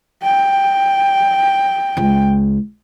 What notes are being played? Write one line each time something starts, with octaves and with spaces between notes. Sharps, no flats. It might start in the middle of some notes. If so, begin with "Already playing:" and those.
G5
C#2 G#3